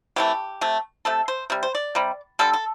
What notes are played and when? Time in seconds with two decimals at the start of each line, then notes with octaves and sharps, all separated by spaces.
0.16 C3 E3 A3 G4
0.61 C3 A3
1.05 C3 A3 A4
1.28 C5
1.50 C3 G3
1.63 C5
1.75 D5
1.95 C3 G3
2.39 D3 G3 A4
2.53 A4